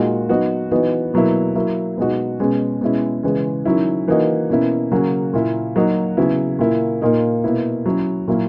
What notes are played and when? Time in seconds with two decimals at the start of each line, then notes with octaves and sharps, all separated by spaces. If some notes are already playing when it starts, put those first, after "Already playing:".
Already playing: A#2 G#3 D#4 F#4
0.29 F#3 B3 D#4 F#4
0.71 E3 B3 D#4 F#4
1.14 B2 F#3 A#3 E4
1.55 F#3 A#3 E4
1.97 B2 G#3 D#4 F#4
2.40 B2 G#3 C#4
2.81 B2 G#3 C#4 E4
3.23 C#3 E3 G#3
3.65 D#3 F#3 C#4 E4
4.08 E3 A#3 D#4 F#4
4.50 B2 A#3 C#4 E4
4.92 C#3 F#3 A#3 C#4 F#4
5.34 A#2 A#3 E4
5.76 F#3 A#3 D#4 F#4
6.17 C#3 F#3 B3 E4
6.59 A#2 A#3 E4
7.02 A#2 A#3 D#4
7.44 B2 A#3 E4
7.86 F#3 C#4 E4
8.28 A#2 F#3 A#3 E4